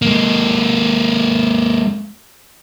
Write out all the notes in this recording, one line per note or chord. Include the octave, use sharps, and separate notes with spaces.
G#3 A#3